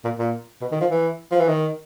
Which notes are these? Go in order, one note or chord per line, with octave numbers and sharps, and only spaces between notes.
A#2
A#2
B2
D#3
F3
E3
F3
E3
D#3